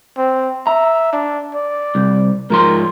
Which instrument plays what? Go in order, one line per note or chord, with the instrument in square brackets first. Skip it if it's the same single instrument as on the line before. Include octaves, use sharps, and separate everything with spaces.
[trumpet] C4
[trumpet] E5 [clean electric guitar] A#5
[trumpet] D4
D5
[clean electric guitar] C2
[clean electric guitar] G#2 F3 C6 [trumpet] A#4